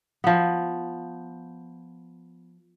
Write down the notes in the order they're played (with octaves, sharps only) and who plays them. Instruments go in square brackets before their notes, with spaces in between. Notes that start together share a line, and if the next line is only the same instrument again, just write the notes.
[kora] F3 B3